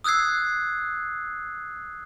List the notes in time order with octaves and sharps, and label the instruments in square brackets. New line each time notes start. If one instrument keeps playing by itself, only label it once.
[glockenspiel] D#6 E6 F#6 G#6 C7